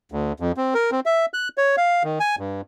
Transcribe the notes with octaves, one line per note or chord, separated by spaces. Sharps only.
D2
F2
C4
A#4
C4
E5
F#6
C#5
F5
D#3
G#5
G2